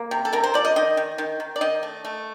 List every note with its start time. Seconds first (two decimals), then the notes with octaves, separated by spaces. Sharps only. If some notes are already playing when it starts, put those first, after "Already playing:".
Already playing: A#3
0.11 C3
0.25 A4
0.33 C3 A#4
0.43 C5
0.54 F3 D5
0.65 D#5
0.76 D#3 D#5
0.97 D#3
1.18 D#3
1.40 D#3
1.56 D5
1.61 D#3 D#5
1.83 A3
2.05 A3